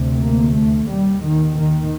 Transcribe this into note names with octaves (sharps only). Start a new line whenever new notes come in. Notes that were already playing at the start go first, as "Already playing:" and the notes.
Already playing: D2 C3
A#3
A3
D#2 G3
D#3
D#3